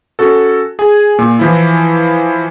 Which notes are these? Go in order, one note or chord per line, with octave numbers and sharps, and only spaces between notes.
C#4 F#4 A4
G#4 G#5
A#2
E3 F3 E4